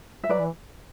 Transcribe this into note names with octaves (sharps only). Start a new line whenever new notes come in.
E5
F#3 B4 D5
E3